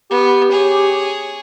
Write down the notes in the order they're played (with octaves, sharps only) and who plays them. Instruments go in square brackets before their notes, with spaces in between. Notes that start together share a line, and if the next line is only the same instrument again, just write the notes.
[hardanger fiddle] B3 [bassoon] G4
[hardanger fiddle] G#4 C#5